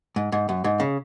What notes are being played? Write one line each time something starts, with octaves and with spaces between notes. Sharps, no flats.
G#2
G#2
F#2
G#2
C#3